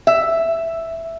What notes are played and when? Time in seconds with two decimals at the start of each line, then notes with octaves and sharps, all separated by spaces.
0.07 E5